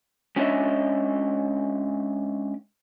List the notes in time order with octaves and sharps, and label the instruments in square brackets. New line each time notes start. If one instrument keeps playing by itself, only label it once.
[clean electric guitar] G#3 C#4 D4 C#5 D#5 E5